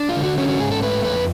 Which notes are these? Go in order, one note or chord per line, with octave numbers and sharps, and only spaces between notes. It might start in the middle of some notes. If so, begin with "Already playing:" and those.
Already playing: D4
F4
D3
F#4
C#4 F#4
F#4
G#2 G#4
A4
A3 B4
F2 B4